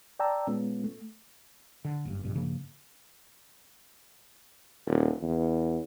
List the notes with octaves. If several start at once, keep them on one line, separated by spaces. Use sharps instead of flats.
D5 G5 A5 A#5 E6
A#2 G#3 B3 C#4 F4
A3
D3
F#1 G2
A#1 G2 B2
G2 C#3 F3 A#3
D#1
E2